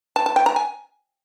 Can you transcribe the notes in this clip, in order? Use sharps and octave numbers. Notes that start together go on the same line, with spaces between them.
A5
A5
G5
A#5
G#5